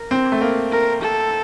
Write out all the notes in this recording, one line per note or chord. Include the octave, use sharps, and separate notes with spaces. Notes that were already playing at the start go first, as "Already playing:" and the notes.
Already playing: A#4
C4
A3
A#3
A#4
A4